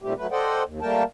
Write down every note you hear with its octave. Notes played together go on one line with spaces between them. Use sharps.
A#2 D#3 G3 A3 C4 G4
F#3 A3 B4
A4 C5 D5 D#5 F#5 G5
D#2
G3 A3 A#3 A#4 G5 A5